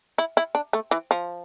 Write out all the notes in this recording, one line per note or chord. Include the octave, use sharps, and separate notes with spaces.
E4
E4
D4
A3
E3
F3